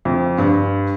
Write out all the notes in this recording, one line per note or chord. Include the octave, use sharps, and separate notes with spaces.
F2
G2